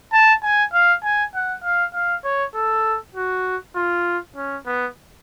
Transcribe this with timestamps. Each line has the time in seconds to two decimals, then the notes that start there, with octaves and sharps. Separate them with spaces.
0.13 A5
0.43 G#5
0.73 F5
1.03 G#5
1.34 F#5
1.64 F5
1.94 F5
2.24 C#5
2.55 A4
3.14 F#4
3.76 F4
4.36 C#4
4.66 B3